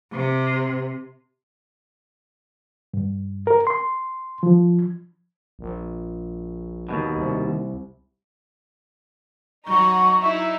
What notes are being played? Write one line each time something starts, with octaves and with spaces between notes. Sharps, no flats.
C3
G2
A#4
C6
F3
A#1
D#2 G#2 B2
C2
F#3 D#4 F#4 A#5 C#6
D#4 E4 E5